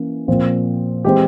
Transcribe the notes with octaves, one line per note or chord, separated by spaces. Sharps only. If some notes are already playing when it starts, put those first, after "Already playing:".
Already playing: E3 A#3 C#4
A#2 F3 C4
E3 G#3 C4 G4